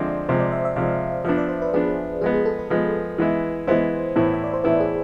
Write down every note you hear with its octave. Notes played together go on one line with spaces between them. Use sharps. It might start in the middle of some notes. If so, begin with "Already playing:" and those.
Already playing: D3 F3 G#3 C4 D5 E5
C3 F3 G#3 C5
D5
E5
E5
C3 F3 G#3 F5
F3 B3 D4 E5
D5
C5
B4
F3 B3 D4 G#4
F3 G#3 B3 G#4
G#4
A4
B4
F3 G#3 B3
E3 G#3 B3 E4
E3 G#3 B3 E4 C5
A2 E3 B3 E4
E5
D5
C5
A2 E3 B3 E4 B4
G#4